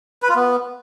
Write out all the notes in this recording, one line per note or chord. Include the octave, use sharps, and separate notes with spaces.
B4
F4
B3